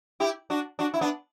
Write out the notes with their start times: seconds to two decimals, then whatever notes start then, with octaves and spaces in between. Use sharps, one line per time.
0.20 E4 G4
0.50 D4 F#4
0.79 D4 F#4
0.94 E4
1.01 B3 D4